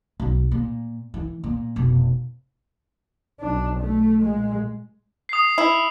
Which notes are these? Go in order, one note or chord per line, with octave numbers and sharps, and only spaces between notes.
B1 C4
A#2
E3
A#2
F1 B2
B1 D4
A3
A#2 G#3
D#6 C7
E4